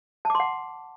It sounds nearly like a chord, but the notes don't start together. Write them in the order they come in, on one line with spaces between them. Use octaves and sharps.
A5 D6 C6 F#5